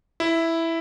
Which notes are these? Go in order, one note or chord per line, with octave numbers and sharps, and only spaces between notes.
E4